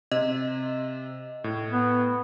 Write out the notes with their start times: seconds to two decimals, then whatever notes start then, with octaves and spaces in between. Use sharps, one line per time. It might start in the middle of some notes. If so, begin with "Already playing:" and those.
0.11 C3 D#5
1.44 A2
1.71 B3